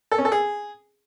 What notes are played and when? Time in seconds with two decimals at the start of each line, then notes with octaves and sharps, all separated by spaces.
0.12 A4
0.18 C#4
0.25 A4
0.32 G#4